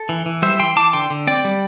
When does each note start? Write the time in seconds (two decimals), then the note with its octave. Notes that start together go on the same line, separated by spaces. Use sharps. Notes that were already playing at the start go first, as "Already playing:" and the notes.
Already playing: A4
0.09 E3
0.26 E3
0.42 G3 C5 E5
0.59 E3 G5 C6
0.76 E3 A5 D6
0.93 D3 G5 C6
1.10 D3
1.27 C4 D5 G5
1.45 G3